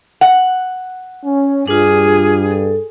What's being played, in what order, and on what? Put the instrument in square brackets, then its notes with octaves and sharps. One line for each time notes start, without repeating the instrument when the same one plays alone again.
[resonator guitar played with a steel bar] F#5
[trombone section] C#4
[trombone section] G2 [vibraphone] D4 F4 [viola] G#4
[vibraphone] A4